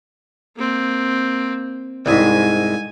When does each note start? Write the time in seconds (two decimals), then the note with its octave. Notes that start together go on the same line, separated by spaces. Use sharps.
0.57 A#3 C4
2.06 C2 G#2 G#5